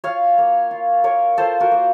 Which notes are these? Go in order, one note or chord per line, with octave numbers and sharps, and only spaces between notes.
F4 C#5 F5
A#3
F4
A#3 A#4 C#5
F4 A4 C5
F#4 A#4
A#3